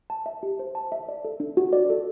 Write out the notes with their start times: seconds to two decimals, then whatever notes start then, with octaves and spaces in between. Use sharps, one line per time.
0.10 A5
0.26 E5
0.43 G4
0.59 C5
0.75 A5
0.92 E5
1.09 D5
1.25 A4
1.40 D4
1.57 F#4
1.73 D5
1.90 A4